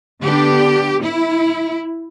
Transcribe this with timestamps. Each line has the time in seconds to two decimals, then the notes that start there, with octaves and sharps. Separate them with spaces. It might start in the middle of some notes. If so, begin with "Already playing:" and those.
0.23 D3 B3 D4 G4
1.03 E4